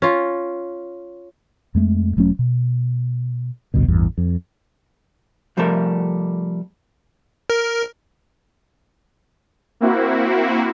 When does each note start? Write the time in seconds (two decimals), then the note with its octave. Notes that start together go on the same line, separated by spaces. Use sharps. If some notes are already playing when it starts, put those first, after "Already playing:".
0.02 C#4 F4
1.75 F2 G#3 A3
2.17 E1 F#3 A3 C#4
2.39 B2
3.74 A1 D2 G2 B2
3.88 A1 E2 G2
4.18 F2
5.57 C3 F3 G3 A3 A4 A#4
7.50 A#4
9.80 A#3 C4 E4 F#4